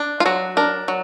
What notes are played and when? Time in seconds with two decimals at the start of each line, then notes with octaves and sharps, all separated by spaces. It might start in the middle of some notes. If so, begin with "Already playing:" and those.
Already playing: D4
0.20 F4
0.26 F#3 F#4
0.57 D4 A#4
0.88 F#3